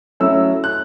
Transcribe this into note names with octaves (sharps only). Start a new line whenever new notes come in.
F#3 A3 C#4 E4 E6
F#6